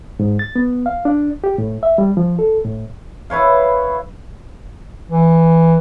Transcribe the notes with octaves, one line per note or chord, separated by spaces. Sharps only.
G#2
A6
B3
F5
D4
G4
A2
E5
G3
F3
A4
A2
E4 B4 C#5 F5
E3